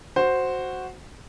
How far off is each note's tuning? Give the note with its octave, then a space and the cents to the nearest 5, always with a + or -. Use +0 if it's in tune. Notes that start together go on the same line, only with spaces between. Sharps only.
F#4 +0 C5 +0